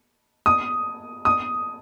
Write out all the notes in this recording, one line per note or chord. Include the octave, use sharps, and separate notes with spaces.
D#6
D#6